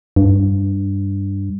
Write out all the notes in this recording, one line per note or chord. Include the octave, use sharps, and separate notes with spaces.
G2